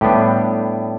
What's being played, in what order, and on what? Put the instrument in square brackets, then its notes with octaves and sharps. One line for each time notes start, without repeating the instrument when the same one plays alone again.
[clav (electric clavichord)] A2 G3 B3 D4 G4